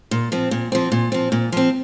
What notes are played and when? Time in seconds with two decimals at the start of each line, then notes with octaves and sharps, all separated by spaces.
0.11 A#2
0.32 F3 C4
0.51 A#2
0.72 F3 C4
0.92 A#2
1.12 F3 C4
1.32 A#2
1.52 F3 C4